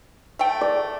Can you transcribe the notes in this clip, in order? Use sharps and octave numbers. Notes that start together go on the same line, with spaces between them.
A3 G5
D5